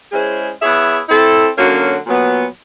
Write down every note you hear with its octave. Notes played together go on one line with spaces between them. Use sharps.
G#3 C#4 E4 G#4 C5
B3 E4 G#4 C#5 E5
C4 E4 A4
D3 F#3 A#3 C#4 F#4
A#2 F#3 B3